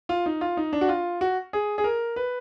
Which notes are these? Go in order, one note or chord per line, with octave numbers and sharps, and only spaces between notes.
F4
D#4
F4
D#4
D4
F#4
F4
F#4
G#4
G#4
A#4
B4